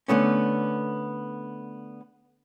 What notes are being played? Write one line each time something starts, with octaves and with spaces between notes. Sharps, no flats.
D3 A3 B3 C#4